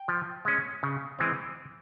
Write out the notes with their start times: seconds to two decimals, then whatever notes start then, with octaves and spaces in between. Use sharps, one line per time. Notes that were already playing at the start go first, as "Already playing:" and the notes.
Already playing: G5
0.08 F3
0.45 G#3 C#4
0.83 C#3
1.19 E3 G#3 C4